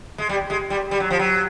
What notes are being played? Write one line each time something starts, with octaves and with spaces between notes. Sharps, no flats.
G#3
G3
G#3
G3
G3
F#3
F3
F#3